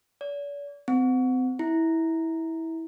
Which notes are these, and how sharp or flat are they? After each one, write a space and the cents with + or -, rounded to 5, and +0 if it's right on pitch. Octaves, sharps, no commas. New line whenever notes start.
D5 -45
C4 -35
E4 -20